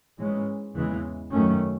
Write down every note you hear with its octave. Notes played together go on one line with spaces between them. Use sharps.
G#2 E3 G#3 C#4
E2 C#3 E3 G#3
F#2 D#3 A3 C#4